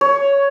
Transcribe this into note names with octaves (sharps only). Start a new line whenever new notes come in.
C#5